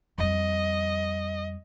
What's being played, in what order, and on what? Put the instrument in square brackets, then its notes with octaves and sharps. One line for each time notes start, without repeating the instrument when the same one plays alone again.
[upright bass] F2 G3 [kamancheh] D#5